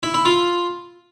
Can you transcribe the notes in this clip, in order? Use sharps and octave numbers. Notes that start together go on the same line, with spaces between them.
E4
E4
F4